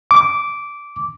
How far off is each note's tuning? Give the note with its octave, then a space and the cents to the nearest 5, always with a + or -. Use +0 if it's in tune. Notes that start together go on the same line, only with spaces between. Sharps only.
D6 -10